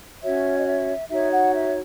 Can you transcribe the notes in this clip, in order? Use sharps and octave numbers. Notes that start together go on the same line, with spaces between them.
C#4 F#4 C#5 E5
D#5
E5
D#4 F#4 C#5 E5
F#5
E5